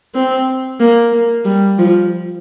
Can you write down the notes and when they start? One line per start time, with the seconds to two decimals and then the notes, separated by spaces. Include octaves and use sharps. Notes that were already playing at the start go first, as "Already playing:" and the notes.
0.14 C4
0.80 A#3
1.13 A#3
1.45 G3
1.78 F3